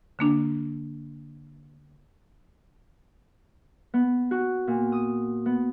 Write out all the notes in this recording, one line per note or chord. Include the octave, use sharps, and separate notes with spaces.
D3 A#3 D4
B3
F#4
A#2
D#6
B3